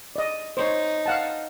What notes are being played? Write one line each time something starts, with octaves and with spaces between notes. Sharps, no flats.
D5 D#5
D#4 C5 C#5
F5 F#5 A5